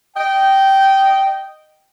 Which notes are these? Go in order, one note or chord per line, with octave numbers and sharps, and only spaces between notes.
D#5 G5